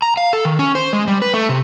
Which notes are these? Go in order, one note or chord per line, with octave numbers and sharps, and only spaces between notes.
A#5
F5
A4
D#3
C#4
C5
G#3
G3
B4
A3
C3